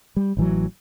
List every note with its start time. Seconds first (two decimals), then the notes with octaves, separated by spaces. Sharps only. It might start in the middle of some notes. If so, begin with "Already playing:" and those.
0.17 G3
0.37 A1 E3 F#3